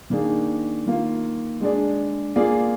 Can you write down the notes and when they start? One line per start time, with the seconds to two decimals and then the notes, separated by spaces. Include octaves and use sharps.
0.10 D#3 A#3 D4 G#4
0.86 D#3 A#3 F4
1.60 G#3 D4 G#4 D5
2.36 A#3 F4 G#4 D5